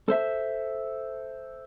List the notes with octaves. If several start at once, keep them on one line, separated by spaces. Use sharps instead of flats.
A4 C5 E5